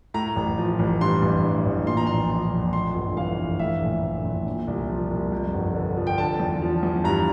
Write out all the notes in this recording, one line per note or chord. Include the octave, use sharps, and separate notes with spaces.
A2 A#5
A1
F3
A1
G2 C6
A1
E3
A1
A#2 C6
A#5
A#1 C6
F3
A#1
F2 C6
G1
E3 F5
G1
A2 E5
A#1
E3
A#1
A#2
C2
F3
C2
F2
G1
D3
F3
G5
D3 A5
E2
F3
E2
G2 A#5